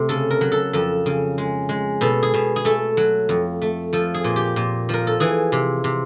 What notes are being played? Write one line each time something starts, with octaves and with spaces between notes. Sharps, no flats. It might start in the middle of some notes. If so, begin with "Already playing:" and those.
Already playing: C3 A3
C#3 A4
A#4
F#3
A4
F2 A4
C#3
G#3
G#3
B2 A4
G#4
B2
G#4
A3 A4
F#3
F2
A3
F3 A4
G#4
A#2
G4
A#2
F3 A#4
A4
E3 G#4
C3
C3